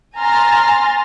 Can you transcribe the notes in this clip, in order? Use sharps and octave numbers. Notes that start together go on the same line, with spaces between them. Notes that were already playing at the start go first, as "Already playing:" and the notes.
G#5 A#5 C6 F6 A6